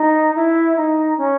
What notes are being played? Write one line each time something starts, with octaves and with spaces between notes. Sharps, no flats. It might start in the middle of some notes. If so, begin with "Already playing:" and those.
Already playing: D#4
E4
D#4
C#4